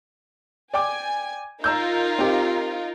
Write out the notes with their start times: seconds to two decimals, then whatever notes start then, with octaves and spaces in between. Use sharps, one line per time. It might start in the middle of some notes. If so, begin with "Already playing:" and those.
0.73 D5 G5 G#5 D6
1.64 D#4 F4 A#4 A#5 E6 G6
2.18 C4 G4